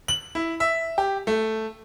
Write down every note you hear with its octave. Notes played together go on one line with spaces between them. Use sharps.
F#7
E4
E5
G4
A3